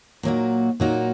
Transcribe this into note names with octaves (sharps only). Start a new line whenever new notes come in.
A#2 F#3 A#3 D#4 F#4
A#2 F#3 A#3 D#4 F#4